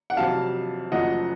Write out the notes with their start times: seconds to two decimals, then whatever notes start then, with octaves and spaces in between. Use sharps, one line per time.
0.10 F#5
0.17 F2 C3 F#3 F5 A5
0.91 F#1 F#2 F3 A3 D#5 F#5